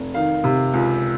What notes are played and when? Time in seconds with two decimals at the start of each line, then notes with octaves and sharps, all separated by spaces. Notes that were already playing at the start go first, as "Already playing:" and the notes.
Already playing: F1
0.14 D#3 F5
0.44 C3
0.74 C#2